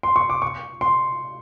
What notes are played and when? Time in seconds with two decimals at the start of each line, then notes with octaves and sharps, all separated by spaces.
0.03 C6
0.16 C#6
0.30 D6
0.42 C#6
0.81 C6